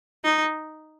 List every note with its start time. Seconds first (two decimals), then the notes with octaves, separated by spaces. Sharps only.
0.24 D#4